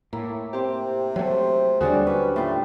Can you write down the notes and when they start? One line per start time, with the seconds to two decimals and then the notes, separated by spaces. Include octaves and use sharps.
0.13 A2 A#3 E4
0.53 C3 C4 G4
1.16 F#3 A3 C5
1.81 D#2 D3 F#3 G3 D4 F#4 G#4
2.07 C#4 B4
2.36 A2 G3 A3 F4 G4